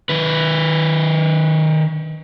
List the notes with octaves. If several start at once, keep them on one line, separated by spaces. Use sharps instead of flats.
D#3 B4